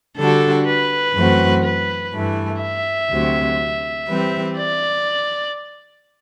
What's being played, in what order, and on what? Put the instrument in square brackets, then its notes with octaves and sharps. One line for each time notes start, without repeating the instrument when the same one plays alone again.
[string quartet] D3 G3 D4 F#4 [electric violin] A4
[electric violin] B4
[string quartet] F#2 E3 A3 C4 F#4
[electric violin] B4
[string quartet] G2 E3 A3
[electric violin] E5
[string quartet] D2 C3 F#3 C4
E3 G3 C4 G4 B4
[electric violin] D5